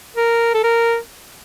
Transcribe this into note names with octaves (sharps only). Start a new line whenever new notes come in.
A#4
A4
A#4